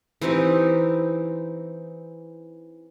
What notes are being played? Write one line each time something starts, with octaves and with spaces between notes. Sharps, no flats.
E3 C4 D#4 G4